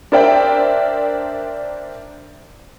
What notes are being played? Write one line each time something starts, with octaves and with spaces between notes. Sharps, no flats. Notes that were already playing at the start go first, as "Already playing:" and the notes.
D4 A#4 C5 D5 E5 G5